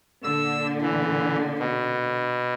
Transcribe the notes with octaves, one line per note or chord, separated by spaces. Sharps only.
A#2 D3 E6
E3
B2